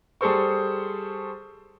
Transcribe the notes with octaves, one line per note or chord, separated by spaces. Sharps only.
G3 G#4 A4 C5 C#6